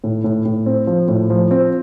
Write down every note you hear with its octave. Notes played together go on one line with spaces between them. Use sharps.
A2
A2
A2
C4
F3
A2
F3
C4